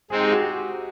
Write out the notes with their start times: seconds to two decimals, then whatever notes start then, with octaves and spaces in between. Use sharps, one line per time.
0.10 G#3 C4 D#4 G#4
0.21 G4
0.32 F#4
0.43 G4